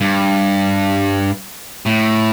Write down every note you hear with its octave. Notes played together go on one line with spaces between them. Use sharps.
G2
A2